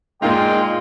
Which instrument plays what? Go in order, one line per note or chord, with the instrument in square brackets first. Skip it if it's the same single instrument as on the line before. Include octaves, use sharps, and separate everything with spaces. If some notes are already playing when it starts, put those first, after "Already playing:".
[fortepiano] A#2 A#3 D#4 [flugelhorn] G#3 [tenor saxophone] F4 [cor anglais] G5